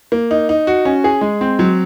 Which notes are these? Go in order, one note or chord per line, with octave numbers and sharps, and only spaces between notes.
A#3
D#4
D#4
F#4
C#4
G#4
G#3
C4
F#3